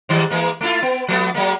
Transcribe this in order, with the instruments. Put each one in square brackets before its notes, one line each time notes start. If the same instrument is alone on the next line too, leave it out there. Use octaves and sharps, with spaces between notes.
[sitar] G#2 D#3 G3
E3 G#3 A#3
A3 E4 F4
B3
F3 A3 B3
F#3 G#3 A#3